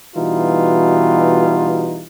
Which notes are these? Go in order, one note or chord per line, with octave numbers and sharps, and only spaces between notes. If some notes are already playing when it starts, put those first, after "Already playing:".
B2 E3 G3 D#4 F4 F#4